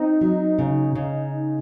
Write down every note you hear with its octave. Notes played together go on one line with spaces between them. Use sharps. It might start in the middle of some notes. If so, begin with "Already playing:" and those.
Already playing: C4 D#4
F#3
C#3
C#3